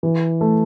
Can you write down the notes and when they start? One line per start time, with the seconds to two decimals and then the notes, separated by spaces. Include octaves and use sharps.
0.03 E3
0.41 A3